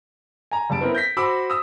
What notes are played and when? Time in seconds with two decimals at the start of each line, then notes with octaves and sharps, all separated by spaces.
0.51 G#5 A#5
0.70 F#1 G3 A5 D7
0.81 B3 C4 E4 A#4 B4
0.95 G6 A#6 B6
1.17 F#4 C5 B5 D6 E6
1.50 D#6 E6